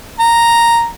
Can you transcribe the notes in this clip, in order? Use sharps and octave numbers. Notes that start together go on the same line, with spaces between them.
A#5